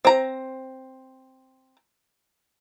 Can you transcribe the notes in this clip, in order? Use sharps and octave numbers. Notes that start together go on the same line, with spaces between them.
C4 A#5